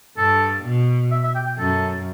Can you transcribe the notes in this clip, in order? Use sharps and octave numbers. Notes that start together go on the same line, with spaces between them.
G2 A4
B2
E5
E5
G5
G5
F#2 A4